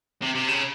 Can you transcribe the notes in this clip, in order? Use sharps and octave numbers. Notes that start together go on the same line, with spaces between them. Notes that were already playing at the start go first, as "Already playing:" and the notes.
C3
C3
C#3